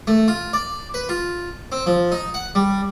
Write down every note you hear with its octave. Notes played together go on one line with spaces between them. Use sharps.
A3
F4
D5
B4
F4
C4
F3
D#4
F#5
G3